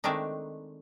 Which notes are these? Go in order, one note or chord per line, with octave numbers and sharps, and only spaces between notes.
D#3 G#3 A3 C4 D4 D#4